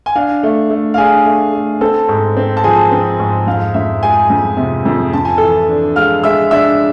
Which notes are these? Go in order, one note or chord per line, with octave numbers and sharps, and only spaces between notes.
G#5
D4 F5
A3
A3
F5
D4 G#4 G#5
A3
A3
C4 A4 A5
G#2
C4
A5
F3 G#4 G#5
C4
G#2
F2 F5
F2 E5
G#3 G#4 G#5
F2
C3
F2
F2 A5
G#5
E3 A4 A5
D4
G#3 F5 F6
G#3 E5 E6
D4 E5 E6